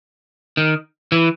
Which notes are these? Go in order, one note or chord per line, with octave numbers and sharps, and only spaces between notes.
D#3
E3